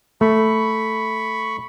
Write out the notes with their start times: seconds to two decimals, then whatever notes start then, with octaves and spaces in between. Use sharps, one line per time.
0.21 A3 B5 C#6